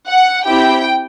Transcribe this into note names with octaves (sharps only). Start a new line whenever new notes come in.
F#5
C4 E4 G4 G5